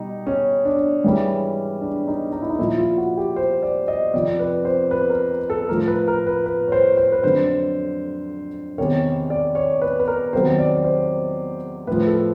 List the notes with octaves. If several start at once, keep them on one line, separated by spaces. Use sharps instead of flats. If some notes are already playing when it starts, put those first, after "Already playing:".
Already playing: B2 G3 D#4
C#4
D4
G#2 E3 G3 C#4
D4
D#4
D#4
E4
D#4
A#2 F3 E4
F4
F#4
G4
C5
D5
D#5
F2 C3 F3 D5
B4
C5
B4
A#4
A4
A2 F3 A#4
B4
A#4
B4
B4
C#5
C5
C5
B4
F2 D3 F#3 C5
E2 C3 D#3 C#5
D5
C#5
B4
B4
A#4
E2 C3 D#3 F#3 C5
D5
C5
A2 F3 B4
A4